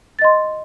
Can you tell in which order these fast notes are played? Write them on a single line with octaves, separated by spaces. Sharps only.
A6 D#5 C6